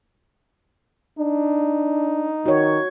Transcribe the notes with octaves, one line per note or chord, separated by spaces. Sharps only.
D4 D#4
D#3 F#4 C#5